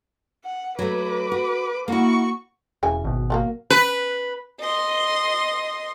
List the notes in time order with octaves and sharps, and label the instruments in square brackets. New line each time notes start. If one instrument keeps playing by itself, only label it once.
[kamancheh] F#5
[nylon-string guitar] F#3 A3 [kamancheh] B4 D6
[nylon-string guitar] F#4
[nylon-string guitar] A#3 E4 [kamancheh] F#4 C#6
[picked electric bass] E1 [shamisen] C#3 E3 G#5
[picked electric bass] G#1 B2
[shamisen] F#3 A3 A#3
[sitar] B4
[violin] D#5 C6